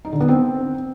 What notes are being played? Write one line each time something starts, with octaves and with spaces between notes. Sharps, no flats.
D#4
D3
B3
C4